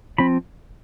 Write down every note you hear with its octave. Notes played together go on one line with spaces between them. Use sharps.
F3 C4 B5